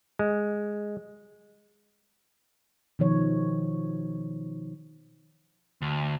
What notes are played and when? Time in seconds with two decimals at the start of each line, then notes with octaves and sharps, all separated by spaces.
0.19 G#3
2.99 B2 D#3 F3 C#5
5.82 D2